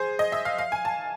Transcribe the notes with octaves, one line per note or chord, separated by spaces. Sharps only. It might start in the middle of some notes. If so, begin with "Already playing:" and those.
Already playing: G#4 C5
D#5
E5
F5
F5
G#5
A5